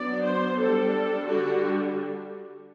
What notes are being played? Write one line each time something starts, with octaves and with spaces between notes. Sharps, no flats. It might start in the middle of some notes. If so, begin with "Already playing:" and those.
Already playing: F#3 B3 D4 D5
C5
G3 D4 A4
D3 G3 D4 F#4